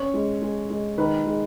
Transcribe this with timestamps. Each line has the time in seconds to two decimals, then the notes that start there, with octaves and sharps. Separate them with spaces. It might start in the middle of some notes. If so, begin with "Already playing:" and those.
Already playing: C#4 C#5
0.14 G#3
0.42 G#3
0.70 G#3
0.98 D#3 B4
1.26 G#3